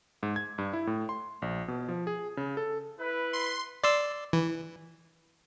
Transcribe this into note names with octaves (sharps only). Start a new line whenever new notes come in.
G#2
G#6
G2
E4
A2
C6
A#1
B2
F3
G#4
C#3
A4
E4 B4
C6
D5 C6 E6
E3